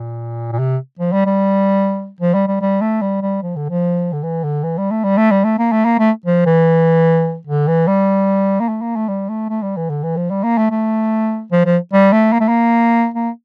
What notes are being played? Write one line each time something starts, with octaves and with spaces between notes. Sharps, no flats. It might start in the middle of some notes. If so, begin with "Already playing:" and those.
Already playing: A#2
A#2
C3
F3
G3
G3
F3
G3
G3
G3
A3
G3
G3
F3
D3
F3
D3
E3
D3
E3
G3
A3
G3
A3
G3
A3
A#3
A3
A#3
A3
F3
E3
D3
E3
G3
A#3
A3
A#3
A3
G3
A3
A3
G3
E3
D3
E3
F3
G3
A#3
A3
A3
F3
F3
G3
A3
A#3
A3
A#3
A#3